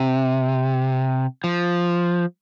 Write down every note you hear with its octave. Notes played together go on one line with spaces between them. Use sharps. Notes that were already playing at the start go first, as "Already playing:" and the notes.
Already playing: C3
F3